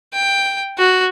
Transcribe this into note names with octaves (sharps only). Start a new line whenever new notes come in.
G5
F#4